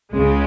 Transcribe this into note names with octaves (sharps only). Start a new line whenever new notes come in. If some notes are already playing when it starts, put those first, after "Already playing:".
C#2 C#3 G#3